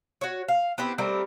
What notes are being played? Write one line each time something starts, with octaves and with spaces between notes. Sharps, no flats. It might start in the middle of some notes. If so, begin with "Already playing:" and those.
F#4 C#5
F5
B3 C4 E4 G4
G3 A3 C4 A#4